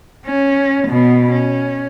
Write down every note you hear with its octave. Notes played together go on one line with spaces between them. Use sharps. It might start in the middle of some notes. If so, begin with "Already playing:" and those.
C#4
B2 B3
C#4